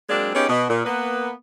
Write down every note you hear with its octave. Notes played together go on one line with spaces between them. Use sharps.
F#3 G#3 A#3 C4 D4
B3 C#4 D#4 G4 G#4 C#5
B2
A#2
A#3 B3 B4